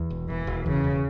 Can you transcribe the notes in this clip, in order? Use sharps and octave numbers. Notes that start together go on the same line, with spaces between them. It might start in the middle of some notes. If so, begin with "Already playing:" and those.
Already playing: E2
E1
E1 E3
E1
E2 C#3
E1